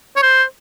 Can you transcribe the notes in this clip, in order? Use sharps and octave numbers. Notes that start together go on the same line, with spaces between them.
C#5
C5